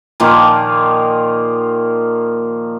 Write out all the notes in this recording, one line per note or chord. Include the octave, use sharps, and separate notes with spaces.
A#2 D#3 F3 A#3